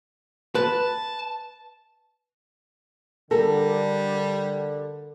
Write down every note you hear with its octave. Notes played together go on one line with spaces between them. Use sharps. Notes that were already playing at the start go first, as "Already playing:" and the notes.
B4 A5
D3 G3 A4 A#4